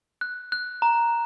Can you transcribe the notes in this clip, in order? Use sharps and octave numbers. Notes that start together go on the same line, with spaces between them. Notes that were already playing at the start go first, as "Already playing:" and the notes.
F#6
F#6
A#5